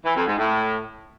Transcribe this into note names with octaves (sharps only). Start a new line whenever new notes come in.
E3
F2
G#2
A2